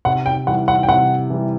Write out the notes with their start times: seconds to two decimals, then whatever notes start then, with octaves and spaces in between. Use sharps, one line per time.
0.05 C3 F#5
0.26 G5
0.47 E3 G3 F#5
0.68 F#5
0.83 G5
0.89 C3 F#5
1.30 E3 G3